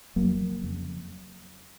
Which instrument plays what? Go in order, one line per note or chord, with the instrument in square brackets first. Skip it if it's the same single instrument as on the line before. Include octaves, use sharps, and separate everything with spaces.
[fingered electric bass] F1 F#3 A#3
F2 C#3